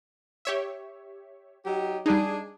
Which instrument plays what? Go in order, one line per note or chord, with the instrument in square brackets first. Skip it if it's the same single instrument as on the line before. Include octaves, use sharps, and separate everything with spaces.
[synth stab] G4 C#5 E5
[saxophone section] F#3 D#4 G4
[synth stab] G3 D#4 [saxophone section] D4 G#4